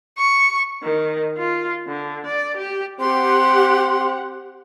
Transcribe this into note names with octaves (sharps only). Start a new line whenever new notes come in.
C#6
D#3
F4
D3
D5
G4
C4 G4 F#5 C6